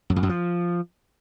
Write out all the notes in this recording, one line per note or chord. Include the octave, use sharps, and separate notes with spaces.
F#2
F2
F#2
F3